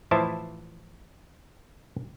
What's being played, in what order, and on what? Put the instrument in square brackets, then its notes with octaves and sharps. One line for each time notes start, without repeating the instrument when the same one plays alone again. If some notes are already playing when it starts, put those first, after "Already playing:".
[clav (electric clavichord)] A2 E3 F3 E4 C5 A5